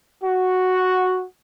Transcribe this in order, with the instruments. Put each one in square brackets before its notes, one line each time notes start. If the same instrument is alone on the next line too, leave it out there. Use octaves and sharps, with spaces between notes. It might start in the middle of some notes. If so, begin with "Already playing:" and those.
[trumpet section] F#4